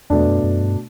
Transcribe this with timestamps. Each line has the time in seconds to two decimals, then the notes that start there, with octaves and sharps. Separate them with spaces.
0.10 E2 B2 A3 D4
0.27 F#2
0.44 F#2
0.61 G2